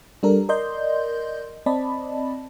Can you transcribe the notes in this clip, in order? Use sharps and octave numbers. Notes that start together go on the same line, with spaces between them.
G3 D4 A4 A#4
A#4 D5 D#5 C6 G6
C4 D5 D#5 A5 B5